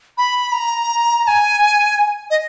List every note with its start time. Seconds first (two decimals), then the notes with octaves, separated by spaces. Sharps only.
0.18 B5
0.52 A#5
1.24 A#5
1.27 G#5
2.30 D#5